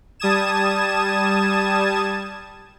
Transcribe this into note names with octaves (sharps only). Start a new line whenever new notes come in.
G3 A5 D#6 G#6 E7